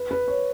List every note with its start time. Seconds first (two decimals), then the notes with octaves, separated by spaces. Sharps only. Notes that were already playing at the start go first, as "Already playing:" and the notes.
Already playing: B4
0.11 B4
0.28 C#5